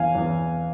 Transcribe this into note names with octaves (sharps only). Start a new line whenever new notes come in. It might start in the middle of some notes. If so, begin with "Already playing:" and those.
Already playing: E2 E3 F5 G#5
E2 E3